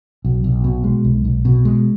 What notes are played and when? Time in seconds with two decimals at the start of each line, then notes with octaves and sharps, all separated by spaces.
0.25 B1
0.44 B1
0.64 B2
0.84 G#3
1.05 B1
1.25 B1
1.45 B2
1.65 G#3